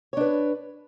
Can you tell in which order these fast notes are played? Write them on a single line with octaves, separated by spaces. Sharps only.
C#5 D4 B4